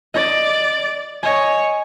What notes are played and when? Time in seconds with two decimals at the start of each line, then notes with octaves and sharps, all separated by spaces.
0.14 D5 D#5
1.23 C#5 D#5 G#5